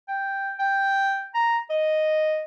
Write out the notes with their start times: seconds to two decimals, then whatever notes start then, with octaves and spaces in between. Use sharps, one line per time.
0.08 G5
0.59 G5
1.35 A#5
1.70 D#5